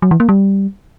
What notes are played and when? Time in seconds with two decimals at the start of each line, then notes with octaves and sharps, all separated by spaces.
0.02 F#3
0.11 E3
0.20 A#3
0.29 G3